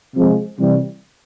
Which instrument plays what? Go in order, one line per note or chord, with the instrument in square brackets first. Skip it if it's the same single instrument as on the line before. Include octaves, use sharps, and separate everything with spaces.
[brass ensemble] C3 F3 G#3
C3 E3 G3